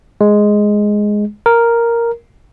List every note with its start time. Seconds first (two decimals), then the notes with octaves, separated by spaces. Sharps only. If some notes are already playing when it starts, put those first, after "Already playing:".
0.21 G#3
1.46 A#4